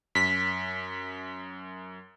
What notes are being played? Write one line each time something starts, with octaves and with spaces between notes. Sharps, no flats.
F#2 B6